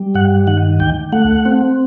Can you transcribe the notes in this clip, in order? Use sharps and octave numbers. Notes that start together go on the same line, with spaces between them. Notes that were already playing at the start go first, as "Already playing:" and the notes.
Already playing: G3
G2 F#5
D#3 F#5
D2 G5
A3 F#5
C4